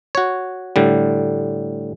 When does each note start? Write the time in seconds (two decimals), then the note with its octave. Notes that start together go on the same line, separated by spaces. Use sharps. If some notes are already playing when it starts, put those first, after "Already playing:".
0.15 F#4 C#5
0.76 A2 D3 G3